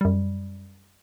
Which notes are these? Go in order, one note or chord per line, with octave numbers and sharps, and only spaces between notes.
F#2 G3